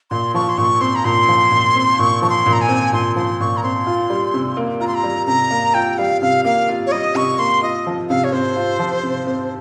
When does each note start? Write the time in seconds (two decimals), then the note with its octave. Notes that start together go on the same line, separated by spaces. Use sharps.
0.11 A#2 C6
0.34 F3 C#6
0.49 C6
0.58 A#2 C#6
0.81 C4 C6
0.95 A#5
1.05 A#2 C6
1.28 F3
1.51 A#2
1.75 C4
1.99 A#2 C#6
2.22 F3 C#6
2.30 C6
2.46 A#2
2.53 A#5
2.61 G#5
2.69 C4
2.93 A#2 C6
3.16 F3 C6
3.40 A#2 C#6
3.57 A#5
3.63 C4 C6
3.86 F4
4.10 G3
4.34 C3
4.57 A#3
4.80 F4 A#5
4.87 C6
4.95 A#5
5.04 G3
5.27 C3 A#5
5.51 A#3
5.74 F4 G5
5.98 G3 F5
6.22 C3 F5
6.45 A#3 F5
6.69 F4
6.87 C#5
6.92 G3 D#5
7.15 C3 C#6
7.39 A#3 C6
7.62 F4 D#5
7.86 F3
8.09 C3 F5
8.24 C#5
8.32 C4 C5
8.56 F4
8.79 F3
9.03 C3
9.27 C4